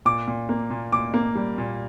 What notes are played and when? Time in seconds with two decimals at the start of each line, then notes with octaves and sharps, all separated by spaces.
0.05 A#2 D6
0.28 A#2
0.49 A#3
0.70 A#2
0.92 A#2 D6
1.14 A#3
1.35 G3
1.58 A#2